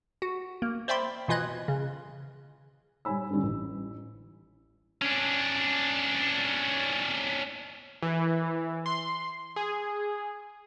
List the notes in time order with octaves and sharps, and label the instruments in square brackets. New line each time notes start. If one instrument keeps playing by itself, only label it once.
[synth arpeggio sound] F#4
A#3
C5 D5 E5 G5 B5 C6
B2 E3 F4 D#5 F#6 G#6
C#3
[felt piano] G3 C#5 G#5 B5 E6
D3 D#3 G3 C#4 D4
A1
[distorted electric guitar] C#4 D4
[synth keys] E3
C6
G#4